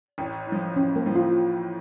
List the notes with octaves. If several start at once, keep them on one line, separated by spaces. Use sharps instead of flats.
A1
A2 F3
A1 C#4
A#3
A2 F3
F4